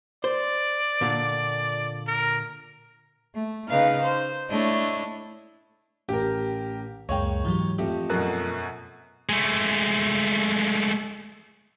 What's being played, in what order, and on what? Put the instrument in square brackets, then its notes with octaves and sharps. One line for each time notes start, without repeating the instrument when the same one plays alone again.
[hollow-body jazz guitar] C5 [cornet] D5
[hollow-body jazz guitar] A#2 D3
[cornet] A#4
[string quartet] A3
C#3 D#4 B4 F5 F6
C5
A3 D4 E4 C#5 D#5
[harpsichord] A1 [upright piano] G4 A#4
[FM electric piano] C#2 F#2 G5 [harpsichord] G#3 A#3 D#4 [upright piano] C#5
[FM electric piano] G#2 E3 F#3 [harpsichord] D#4 G4
[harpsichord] F2 A3 D#5 [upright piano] G4
[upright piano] F#2 B2 [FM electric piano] A4 A#4 F#6
[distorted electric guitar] G#3 A3